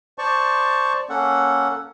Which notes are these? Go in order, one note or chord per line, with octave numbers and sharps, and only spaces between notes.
C5 D5 A5 C#6
A#3 C#4 A4 F#5